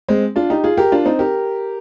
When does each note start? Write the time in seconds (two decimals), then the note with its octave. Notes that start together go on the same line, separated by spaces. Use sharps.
0.08 G#3 C4
0.36 D4 F4
0.50 D#4 G4
0.64 F4 G#4
0.77 G4 A#4
0.92 D4 F4
1.05 C4 D#4
1.19 G4 A#4